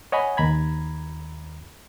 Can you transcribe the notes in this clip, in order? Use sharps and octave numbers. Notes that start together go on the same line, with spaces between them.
C#5 D#5 F#5 G#5 B5
D#2 A#5 B5 G#6